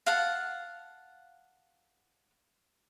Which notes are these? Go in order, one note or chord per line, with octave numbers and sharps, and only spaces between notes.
F5 F#5 A5